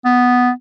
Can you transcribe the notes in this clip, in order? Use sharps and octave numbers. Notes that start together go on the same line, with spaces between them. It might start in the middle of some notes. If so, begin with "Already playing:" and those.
B3